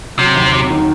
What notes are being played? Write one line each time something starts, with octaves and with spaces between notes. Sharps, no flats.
C3 F#3
D#2
F#3
D#3